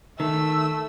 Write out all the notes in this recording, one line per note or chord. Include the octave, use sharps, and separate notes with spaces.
D#3 A3 E6